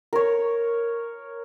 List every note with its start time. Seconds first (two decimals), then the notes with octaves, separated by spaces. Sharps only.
0.13 A#4 C#5